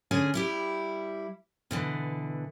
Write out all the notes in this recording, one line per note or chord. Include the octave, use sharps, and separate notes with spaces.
D3 C#4 G#4 G#5
G3 E4 G4
B2 D3 E3